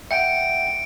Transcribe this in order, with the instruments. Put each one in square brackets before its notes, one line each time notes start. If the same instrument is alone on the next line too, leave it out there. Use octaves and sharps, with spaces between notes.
[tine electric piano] E5 F#5 G5 [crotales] C#7 D7